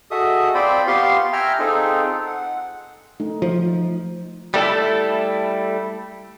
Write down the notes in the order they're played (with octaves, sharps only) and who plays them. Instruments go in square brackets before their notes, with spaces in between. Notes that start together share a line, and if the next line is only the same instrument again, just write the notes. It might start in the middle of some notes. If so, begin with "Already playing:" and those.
[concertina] F#4 G#4 A4 D#5 E5 D#6
C4 F4 C5 D5 G5 B5
B3 F4 G4 F5 C6 C#6
E5 G5 G#5 A#5 F6
C4 D#4 F4 G#4 A4
F#5
[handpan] A3 D#4
[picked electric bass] F3
[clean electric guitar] G3 A3 E4 A4